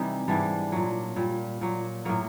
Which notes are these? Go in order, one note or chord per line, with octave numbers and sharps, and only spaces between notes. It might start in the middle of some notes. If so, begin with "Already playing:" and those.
Already playing: C3 E3 G3 D#4
G#2 E3 G3 D4
A#2 F#3
A#2 G3
A#2 F#3
A2 F#3 A#3